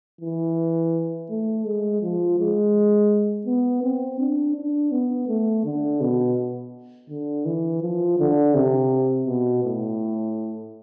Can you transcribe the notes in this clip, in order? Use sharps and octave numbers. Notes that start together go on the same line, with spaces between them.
E3
A3
G#3
F3
G#3
B3
C4
D4
D4
B3
A3
D3
B2
D3
E3
F3
D3
C3
B2
A2